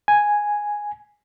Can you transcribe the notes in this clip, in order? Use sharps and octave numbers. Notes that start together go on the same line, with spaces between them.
G#5